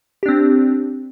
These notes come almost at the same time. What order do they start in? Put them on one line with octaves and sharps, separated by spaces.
G4 D4 C4